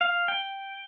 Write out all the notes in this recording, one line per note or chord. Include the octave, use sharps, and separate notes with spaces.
F5
G5